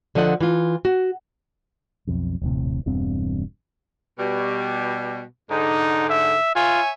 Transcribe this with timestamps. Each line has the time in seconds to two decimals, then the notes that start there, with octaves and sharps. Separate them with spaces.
0.15 D3 F3 A4 D#5 F#5
0.40 E3 F4
0.85 F#4
2.07 B1 F2
2.42 D#1 A#1 A2 C3
2.86 E1 E2 G2 C4
4.19 B2 G3
5.51 G#2 D3 D#4
6.10 E5
6.56 F4 C#5 E5 G#5